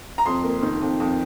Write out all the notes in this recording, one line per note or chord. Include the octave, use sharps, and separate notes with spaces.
A#5
F2 C6
A#3
D#3
F2
F2